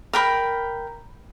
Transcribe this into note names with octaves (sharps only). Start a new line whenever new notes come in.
A#4 G5 B5